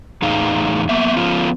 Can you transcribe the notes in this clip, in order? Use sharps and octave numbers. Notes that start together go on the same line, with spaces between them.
E2 A2 D#4 G#4 F5
A#3 B3 E5
F3 B3 C#4 F4